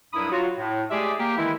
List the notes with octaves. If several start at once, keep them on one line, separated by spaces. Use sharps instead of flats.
C2 G2 F#3 E4 B5 D#6
F#3 F4 F#4
A2
G#3 A3 G4 G#4 D5 E5
A#3 G4
D#3 E3 G#3 E4